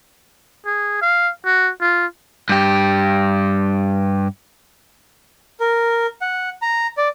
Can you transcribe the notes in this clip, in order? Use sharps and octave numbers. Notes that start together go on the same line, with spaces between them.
G#4
F5
F#4
F4
G2 G4
A#4
F#5
A#5
D5